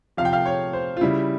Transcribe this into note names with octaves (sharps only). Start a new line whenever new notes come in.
C3 F3 F5
G5
F5
C#5
C5
F4
C#3 G3 E4